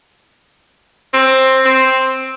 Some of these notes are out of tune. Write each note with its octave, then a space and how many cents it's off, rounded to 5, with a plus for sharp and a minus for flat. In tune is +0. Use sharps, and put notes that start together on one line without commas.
C4 +10
C4 +5